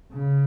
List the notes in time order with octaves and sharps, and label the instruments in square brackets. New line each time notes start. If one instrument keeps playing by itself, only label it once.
[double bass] C#3